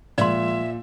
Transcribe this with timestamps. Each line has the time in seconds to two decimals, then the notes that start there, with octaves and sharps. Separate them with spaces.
0.18 A#2 F3 G#3 D5 E5 C6